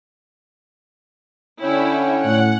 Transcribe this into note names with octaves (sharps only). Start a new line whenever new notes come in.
D3 C#4 E4 C#5 G5
A2 F#5